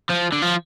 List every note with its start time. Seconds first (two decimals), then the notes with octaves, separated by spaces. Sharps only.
0.09 F3
0.32 D3
0.42 F3